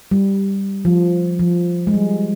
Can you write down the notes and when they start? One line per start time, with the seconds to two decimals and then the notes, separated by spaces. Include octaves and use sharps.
0.11 G3
0.85 F3
1.39 F3
1.87 G#3
1.94 G3